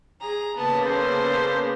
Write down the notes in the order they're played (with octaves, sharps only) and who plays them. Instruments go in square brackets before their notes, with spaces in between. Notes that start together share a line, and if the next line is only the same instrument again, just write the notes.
[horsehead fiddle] G#4 [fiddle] A#5
[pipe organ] C#3 A#3 [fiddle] B3 [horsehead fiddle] A5
[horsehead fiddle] C#4 A4 [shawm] C5